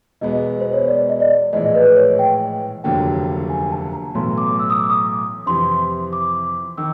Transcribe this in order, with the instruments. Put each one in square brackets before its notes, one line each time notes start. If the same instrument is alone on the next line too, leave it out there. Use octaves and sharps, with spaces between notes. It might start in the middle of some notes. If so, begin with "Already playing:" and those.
[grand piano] E1 E2 B2 G#3 B3 [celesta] D#5
[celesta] C5
C#5
D5
D#5
D5
[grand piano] A#1 A2 E3 G#3 [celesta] D#5
[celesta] B4
C#5
G5
[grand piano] F1 D#2 D3 F#3 A#3 [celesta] G5
[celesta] G#5
A5
A#5
[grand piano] B1 A2 E3 A3 [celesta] C6
[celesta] D6
E6
D#6
D6
D#6
[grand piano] F2 C3 E3 [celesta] C6
[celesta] D6
[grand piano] D#3 [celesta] E6